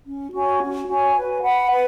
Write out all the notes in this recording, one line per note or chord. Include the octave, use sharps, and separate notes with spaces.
C#4
F#4 C#5 G#5
C#4
F#4 C#5 G#5
B4
F#5 B5
B4